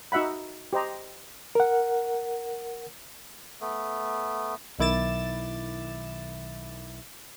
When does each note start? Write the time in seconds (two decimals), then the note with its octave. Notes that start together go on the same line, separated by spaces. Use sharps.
0.12 D#4 F#4 E5 F#5 B5
0.73 G4 C5 D#5 A#5
1.55 A#4 F#5
3.61 A3 B3
4.79 B1 D#3 E4 D6 A6 E7